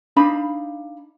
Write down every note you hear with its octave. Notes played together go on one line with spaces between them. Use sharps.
D4 D#4 F5 B5